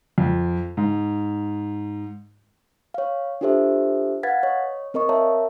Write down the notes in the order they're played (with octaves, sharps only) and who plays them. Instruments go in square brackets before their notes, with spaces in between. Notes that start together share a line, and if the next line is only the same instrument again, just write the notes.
[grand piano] F2
G#2
[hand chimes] C#5 F5
D4 F4 G4 A4 C5 E5
B4 F5 F#5 G#6 A6 B6
C#5 D#5
C4 A#4 D#5 C#6
A#4 C#5 E5 F5 A5 A#5